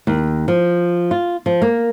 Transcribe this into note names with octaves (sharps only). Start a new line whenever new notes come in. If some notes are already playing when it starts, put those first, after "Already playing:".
D#2
F3
F4
F3
A#3